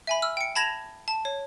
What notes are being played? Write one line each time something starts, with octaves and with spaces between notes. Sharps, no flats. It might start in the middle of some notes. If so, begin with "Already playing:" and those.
E5 G#5 B5
E6 F6
G5 C#7
A5 B5 G#6 A#6 E7 F7
A5
C#5